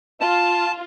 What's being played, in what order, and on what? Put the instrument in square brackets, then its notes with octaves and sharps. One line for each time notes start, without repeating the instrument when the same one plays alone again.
[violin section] F4 [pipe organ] A5